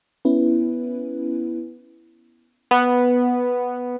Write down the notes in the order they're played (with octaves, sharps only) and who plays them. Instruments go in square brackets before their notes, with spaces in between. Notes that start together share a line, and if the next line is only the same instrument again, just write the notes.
[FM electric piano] B3 C#4 E4 B4
[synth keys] B3